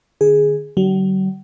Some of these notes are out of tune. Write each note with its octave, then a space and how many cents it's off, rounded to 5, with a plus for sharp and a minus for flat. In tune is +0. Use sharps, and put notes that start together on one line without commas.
D3 +30 G#4 +0
D3 +0 F#3 +45